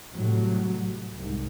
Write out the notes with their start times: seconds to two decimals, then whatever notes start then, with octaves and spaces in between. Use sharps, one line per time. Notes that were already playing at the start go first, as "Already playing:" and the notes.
0.13 A2 C3 F#3 G3
1.14 C2 G#2